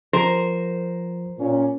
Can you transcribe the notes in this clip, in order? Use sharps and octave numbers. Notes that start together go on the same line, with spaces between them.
F3 A#4 C5
A#2 C#4